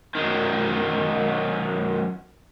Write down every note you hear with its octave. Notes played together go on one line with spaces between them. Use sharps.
F#2 D#3